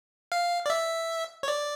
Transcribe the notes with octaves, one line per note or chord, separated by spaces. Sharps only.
F5
D5
E5
C#5
D5